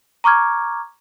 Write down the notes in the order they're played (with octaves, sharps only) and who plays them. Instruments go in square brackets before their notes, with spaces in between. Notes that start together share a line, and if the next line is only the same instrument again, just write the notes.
[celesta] A#5 C#6 D6 F6 G#6